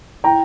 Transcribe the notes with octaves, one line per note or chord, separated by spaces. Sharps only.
E4 G5 A#5